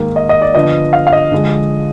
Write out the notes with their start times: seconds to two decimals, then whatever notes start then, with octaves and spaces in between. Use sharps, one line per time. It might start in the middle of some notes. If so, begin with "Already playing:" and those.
Already playing: G#2 D#3 A#3
0.16 D#5
0.29 D#5
0.42 D5
0.55 D3 F3 B3 D4 D#5
0.93 F5
1.07 F5
1.13 D#5
1.32 D3 F3 G#3